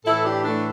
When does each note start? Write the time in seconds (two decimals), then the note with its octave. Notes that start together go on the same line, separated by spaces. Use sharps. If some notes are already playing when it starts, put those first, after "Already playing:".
0.05 A2 E3 E4 A4
0.24 D4 G4
0.44 A3 D4